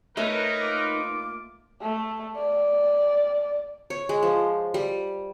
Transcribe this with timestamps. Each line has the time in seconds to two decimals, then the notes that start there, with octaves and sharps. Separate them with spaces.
0.17 A3 D#4 A#4 B4 C#5 E5
0.61 A#3 F4 D6
1.81 A3
2.36 D5
3.90 C#5
4.09 G#3
4.23 F3
4.74 G3